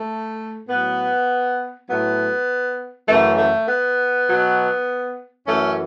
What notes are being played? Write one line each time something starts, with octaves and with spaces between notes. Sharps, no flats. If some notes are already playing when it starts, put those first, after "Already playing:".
Already playing: A3
A2 F#3 B3
A2 F#3 B3
F#2 C#3 E3 A3
A3
B3
B2 F#3
F#2 E3 A3 C#4